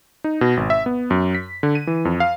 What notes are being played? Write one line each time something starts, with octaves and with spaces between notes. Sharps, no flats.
D#4
B2
G#1
E5
B3
F#2
B6
D3
D#7
E3
F2
F5